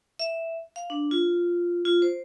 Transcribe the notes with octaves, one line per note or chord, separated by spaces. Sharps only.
E5
F5
D4
F4
F4
C5